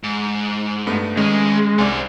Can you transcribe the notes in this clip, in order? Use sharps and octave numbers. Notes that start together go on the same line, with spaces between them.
G#2
G2 A3 B3
D#3 G#3 C#4 G#4
C2 C5 D5 G#5